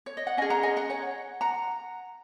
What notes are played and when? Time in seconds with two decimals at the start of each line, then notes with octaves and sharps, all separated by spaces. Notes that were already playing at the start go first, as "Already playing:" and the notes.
0.06 C#5
0.17 D#5
0.27 F#5
0.37 C#4 D#5 G#5
0.42 G#4
0.50 F#5 A#5
0.63 D#5 G#5
0.77 F#5 A#5
0.90 C#5 F#5
1.41 F#5 A#5